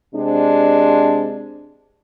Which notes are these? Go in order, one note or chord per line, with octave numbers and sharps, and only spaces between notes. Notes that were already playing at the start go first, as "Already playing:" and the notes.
C3 G#3 C4 D4